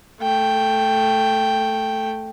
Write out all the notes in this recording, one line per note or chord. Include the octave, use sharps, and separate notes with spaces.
A3 G5